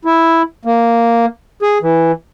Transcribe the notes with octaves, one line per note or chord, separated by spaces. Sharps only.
E4
A#3
G#4
E3